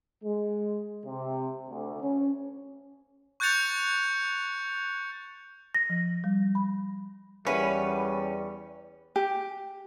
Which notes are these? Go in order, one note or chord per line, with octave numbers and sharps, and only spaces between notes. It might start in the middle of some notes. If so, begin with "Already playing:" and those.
G#3
C3
D2
C#4
C#6 F#6 G6 A6 C#7 F7
A#6
F3
G3
B5
E2 G3 C#4 A#4 B4 E5 F#5
G4